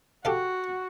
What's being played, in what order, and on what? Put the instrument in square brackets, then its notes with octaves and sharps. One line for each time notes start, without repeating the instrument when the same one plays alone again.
[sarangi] F#4 [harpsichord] G4 A4 F5